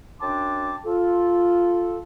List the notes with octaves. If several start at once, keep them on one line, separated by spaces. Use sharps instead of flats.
F#2 D4 G5 A5 C6 D6
F4 A4